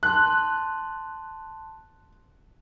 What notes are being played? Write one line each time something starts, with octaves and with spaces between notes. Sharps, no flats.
A5 C6 F#6